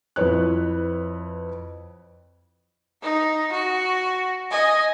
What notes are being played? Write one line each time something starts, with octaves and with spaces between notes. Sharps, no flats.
F2 E4 B4 C#5 F#6
D#4
F#4
D#5 G#5